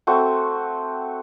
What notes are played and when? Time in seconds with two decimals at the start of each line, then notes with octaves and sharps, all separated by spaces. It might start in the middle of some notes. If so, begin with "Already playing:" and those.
0.07 A3 C4 F#4 A4